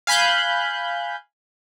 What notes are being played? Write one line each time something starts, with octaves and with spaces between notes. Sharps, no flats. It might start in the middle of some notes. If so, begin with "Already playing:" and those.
F5 G#5 B5 F#6 G6